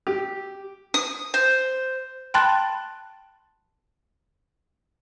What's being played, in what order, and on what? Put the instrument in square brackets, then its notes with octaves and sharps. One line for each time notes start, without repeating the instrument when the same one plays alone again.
[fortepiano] G4
[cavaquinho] D#6
C5
[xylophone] G5 A5 B5 C6 F#6 A6